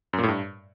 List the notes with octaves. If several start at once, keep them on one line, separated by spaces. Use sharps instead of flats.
F#2
A#2
A2
G2